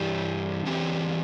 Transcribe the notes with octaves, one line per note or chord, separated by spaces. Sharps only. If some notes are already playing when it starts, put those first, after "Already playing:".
Already playing: G2 E3 G3 D4 G4
E2 E3 C4 G4